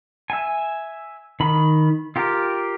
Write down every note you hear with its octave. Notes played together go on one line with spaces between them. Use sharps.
E5 G#5
D#3 B5
F4 G4 A#4